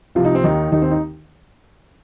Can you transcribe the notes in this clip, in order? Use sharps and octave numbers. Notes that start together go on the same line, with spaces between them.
C2 C3 F3 F4
D#4
C4
D#2 D#3 D#4
D#2 D#3 D#4
C4
D#4